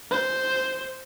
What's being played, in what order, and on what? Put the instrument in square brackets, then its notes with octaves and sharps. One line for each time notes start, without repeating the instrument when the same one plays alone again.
[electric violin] C5